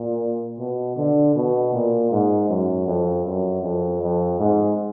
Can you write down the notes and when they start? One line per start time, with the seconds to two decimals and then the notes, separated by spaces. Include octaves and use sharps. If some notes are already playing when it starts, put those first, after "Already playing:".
Already playing: A#2
0.59 B2
0.97 D3
1.35 B2
1.73 A#2
2.11 G#2
2.49 F#2
2.87 F2
3.25 F#2
3.63 F2
4.01 F2
4.40 G#2